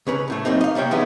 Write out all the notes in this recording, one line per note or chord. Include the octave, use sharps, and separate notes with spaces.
C#2 C#4 B4 A#5
C#2 A2 A3
F#2 A#3 C4 D#4
D#5 F5
C3 G3 A#3 C#5 G5
E3 G#3 B3 C#4 D#4 E4